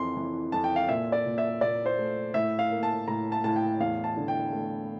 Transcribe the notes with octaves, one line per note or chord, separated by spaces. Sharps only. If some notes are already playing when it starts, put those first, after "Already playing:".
Already playing: F2 E3 C6
E3
F2 A5
G5
F5
A#2 E5
D5
A#2
E5
A#2 D5
C5
A3
A2 E5
F5
A#3
A5
A2 A#5
A5
A2 A5
G5
E2 F5
A5
D3
G5
A3